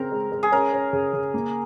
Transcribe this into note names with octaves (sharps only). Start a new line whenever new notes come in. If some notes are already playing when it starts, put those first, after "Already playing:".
Already playing: C#3 C4 A#4
G#3
G#3
G#4
C#4 A#4
C#4
C#3
C#3
A#3